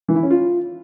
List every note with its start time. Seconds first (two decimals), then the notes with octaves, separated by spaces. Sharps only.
0.08 E3
0.16 E4
0.23 C#4
0.31 F4